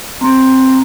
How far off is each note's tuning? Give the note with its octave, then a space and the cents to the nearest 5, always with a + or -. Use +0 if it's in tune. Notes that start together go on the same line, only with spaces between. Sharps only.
C4 +5 A#5 +0